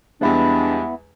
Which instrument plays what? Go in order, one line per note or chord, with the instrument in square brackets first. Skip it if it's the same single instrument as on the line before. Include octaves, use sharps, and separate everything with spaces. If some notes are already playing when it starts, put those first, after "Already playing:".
[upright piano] E2 G3 G#3 [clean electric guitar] B3 E4 [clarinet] D4